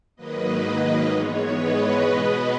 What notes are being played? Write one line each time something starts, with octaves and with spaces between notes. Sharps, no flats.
G#2 D#3 F#3 A#3 B4 D#5
B4
G#2 E3 G#3 B3 C#5
B4 D#5
B2 G#3 B3 B4 D#5